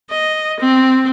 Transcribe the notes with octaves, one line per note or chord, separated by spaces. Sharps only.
D#5
C4